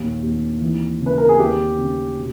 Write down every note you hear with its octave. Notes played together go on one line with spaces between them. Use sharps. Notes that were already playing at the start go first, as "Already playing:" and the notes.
Already playing: A#1 D#2
D#2
E3
C#3
B4
A#4
G#4
D#2 G4
C#3
B2